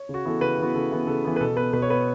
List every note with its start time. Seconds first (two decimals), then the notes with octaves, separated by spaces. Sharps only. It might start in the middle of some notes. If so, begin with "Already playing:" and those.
Already playing: C#5
0.09 C#3
0.14 F#4
0.25 E3 B3 A4
0.41 C#3 B4
0.58 E3 B3 F#4
0.74 C#3 A4
0.91 E3 B3
1.07 C#3 A4
1.25 E3 B3
1.36 B4
1.41 B2 A4
1.57 B3 B4
1.73 B2 B4
1.82 C#5
1.90 B3 B4